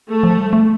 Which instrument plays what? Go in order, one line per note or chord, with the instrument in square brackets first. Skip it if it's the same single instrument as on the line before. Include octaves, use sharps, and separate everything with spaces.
[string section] A3
[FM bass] F3
G3
A3